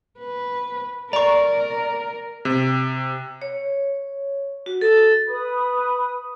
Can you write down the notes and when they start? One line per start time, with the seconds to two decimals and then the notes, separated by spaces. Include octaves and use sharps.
0.19 B4
1.13 A#4 D5 A#5 C#6
2.45 C3
3.42 C#5
4.66 F#4
4.81 A4
5.28 B4 B5 D#6